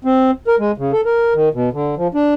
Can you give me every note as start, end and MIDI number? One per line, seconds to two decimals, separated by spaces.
0.04 0.31 60
0.47 0.56 70
0.59 0.72 56
0.78 0.92 49
0.92 1.01 69
1.05 1.34 70
1.34 1.49 51
1.54 1.69 47
1.73 1.95 50
1.97 2.08 53
2.15 2.34 62